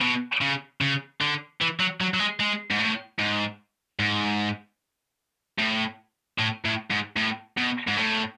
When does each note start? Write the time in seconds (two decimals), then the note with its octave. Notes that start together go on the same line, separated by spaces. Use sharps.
0.01 B2
0.41 C#3
0.81 C#3
1.21 D3
1.61 E3
1.80 F#3
2.01 F#3
2.14 F#3
2.19 G#3
2.40 G#3
2.71 G#2
2.80 A2
3.19 G#2
4.00 G#2
5.58 A2
6.38 A2
6.65 A2
6.91 G#2
7.17 A2
7.57 B2
7.87 G#2
7.97 A2